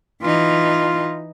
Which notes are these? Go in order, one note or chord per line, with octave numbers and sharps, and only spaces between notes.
E3 D#4 F4